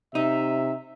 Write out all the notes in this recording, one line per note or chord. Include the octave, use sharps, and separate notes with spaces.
C3 D#4 E5